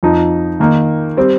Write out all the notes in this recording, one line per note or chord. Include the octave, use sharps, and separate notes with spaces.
F2 F3 D#4
D#3 A#3 D#4
G3 C4